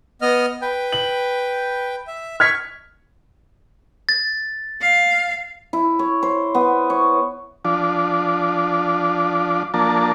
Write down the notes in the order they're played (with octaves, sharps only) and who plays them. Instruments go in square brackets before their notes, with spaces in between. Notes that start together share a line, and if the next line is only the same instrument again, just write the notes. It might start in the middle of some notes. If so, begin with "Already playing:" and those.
[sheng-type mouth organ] B3 D#5 F6
B4 G5
[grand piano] F#7
[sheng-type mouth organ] E5
[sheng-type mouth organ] C#6 [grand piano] F6 G#6 B6
[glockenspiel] A6
[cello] F5
[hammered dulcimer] E4
C#5
C5
B3
C#5
[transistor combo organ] F3 D4
F3 A#3 D4 A5